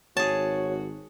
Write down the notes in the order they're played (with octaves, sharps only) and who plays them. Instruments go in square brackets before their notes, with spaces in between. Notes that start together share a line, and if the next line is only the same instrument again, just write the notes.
[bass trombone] G#1 [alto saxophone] F#4 [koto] G#4 A5 [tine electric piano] C#5